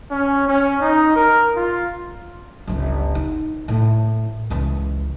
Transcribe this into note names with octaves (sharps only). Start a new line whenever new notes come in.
C#4
C#4
D#4
A#4
F4
G1 C#2
D#4
A2
C#2 E3